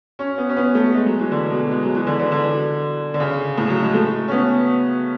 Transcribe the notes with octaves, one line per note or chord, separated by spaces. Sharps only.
C#4
B3
C#4
B3
A3
G#3
F#3
E3
D3
B2
G#3
F#3
E3
D3
D3
D3
D3
C#3
A2
F#3
G#3
A3
C#4
B3